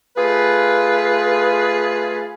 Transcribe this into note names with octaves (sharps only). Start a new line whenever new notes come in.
A3 F4 G#4 B4